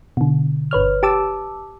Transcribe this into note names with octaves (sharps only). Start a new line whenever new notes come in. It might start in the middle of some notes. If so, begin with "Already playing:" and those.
B2 D3
G1 B4 C#5 F6
G4 A5 D6 E6